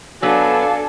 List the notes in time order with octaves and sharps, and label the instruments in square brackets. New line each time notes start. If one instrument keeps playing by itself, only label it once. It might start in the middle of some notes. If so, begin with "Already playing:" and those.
[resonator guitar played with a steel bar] F#3 B3 [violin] D4 G#5 [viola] A4 [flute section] F5 D6